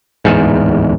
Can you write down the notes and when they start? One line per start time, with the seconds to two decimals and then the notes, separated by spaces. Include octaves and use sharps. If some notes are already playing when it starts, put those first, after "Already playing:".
0.25 D1 E2 G#2